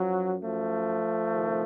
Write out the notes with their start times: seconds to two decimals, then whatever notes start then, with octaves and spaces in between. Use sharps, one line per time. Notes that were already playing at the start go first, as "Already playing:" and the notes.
Already playing: F#2 F3 F#3
0.42 F3 A3
1.32 C2 C3 D#3